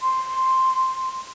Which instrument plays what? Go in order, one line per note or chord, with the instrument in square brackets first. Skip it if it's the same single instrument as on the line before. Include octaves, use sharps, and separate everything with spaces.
[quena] C6